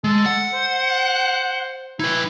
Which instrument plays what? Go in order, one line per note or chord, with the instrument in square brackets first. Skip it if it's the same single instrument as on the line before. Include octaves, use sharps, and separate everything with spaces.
[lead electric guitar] G#3 [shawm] A4
[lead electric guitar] F#5
[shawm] C5
[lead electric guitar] D#4 B4 [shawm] E4